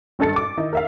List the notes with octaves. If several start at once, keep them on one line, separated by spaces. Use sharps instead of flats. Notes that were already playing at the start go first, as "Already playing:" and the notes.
G#1 G2 A4 A6 C#7
D6
D#3 D#4 E4
A#4 E5 F5